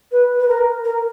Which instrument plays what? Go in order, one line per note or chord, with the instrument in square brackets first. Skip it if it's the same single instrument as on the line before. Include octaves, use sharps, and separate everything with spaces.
[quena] B4
B4
A#4
A#4